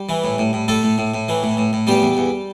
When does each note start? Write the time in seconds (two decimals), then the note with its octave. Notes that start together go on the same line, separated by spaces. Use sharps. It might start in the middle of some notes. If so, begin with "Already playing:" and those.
Already playing: G3 G4
0.09 E3
0.24 A2
0.38 A2
0.53 A2
0.68 A2 A3 A4
0.83 A2
0.98 A2
1.14 A2
1.29 E3
1.43 A2
1.57 A2
1.73 A2
1.87 E2 G3 G4
2.02 E2
2.17 E2